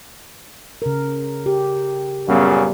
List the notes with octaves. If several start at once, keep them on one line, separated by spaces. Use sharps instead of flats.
C#3 A#4
G4
F#2 A#2 C#3 G3 B3